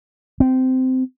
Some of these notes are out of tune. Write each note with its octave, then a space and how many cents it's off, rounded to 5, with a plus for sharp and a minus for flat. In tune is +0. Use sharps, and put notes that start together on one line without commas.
C4 -15